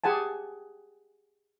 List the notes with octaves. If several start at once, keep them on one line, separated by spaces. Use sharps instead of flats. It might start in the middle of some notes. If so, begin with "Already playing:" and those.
G4 G#4 F#5 G#5 A5